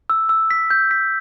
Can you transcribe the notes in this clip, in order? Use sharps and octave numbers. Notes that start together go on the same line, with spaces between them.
E6
E6
B6
G6
B6